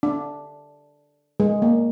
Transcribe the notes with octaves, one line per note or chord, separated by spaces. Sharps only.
D4
G#3
A#3